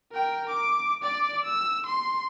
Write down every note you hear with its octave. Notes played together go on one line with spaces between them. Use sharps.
A#4 G5
D6
D5 D6
E6
C6